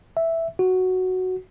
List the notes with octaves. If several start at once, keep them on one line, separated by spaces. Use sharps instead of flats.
E5
F#4